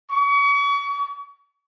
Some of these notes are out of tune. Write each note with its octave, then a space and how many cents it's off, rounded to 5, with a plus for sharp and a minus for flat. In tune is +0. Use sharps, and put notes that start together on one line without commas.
C#6 +35